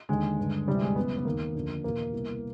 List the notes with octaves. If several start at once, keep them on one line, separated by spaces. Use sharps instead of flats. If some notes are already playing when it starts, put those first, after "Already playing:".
D#2 D3 G#3
G2 D3
D2 C3 E3 G3
G#3
F#2 C#3 E3 B3
B3
D#2 D#3 A#3
F2 D3
E2 B2 A#3
C2 B2